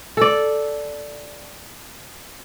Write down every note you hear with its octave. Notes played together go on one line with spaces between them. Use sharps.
A4 D5